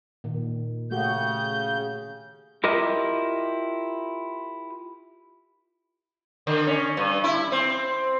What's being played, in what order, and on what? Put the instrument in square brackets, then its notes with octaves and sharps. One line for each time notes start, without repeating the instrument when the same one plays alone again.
[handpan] A#2 D#3
[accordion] C#3 G6 [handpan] A3 F#4 G4
[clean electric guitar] E4 F4 G4 A#4 D#5
[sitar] D3
C#4
G2
E4
C4